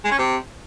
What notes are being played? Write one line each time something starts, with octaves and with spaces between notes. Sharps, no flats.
G#3
C#4
C3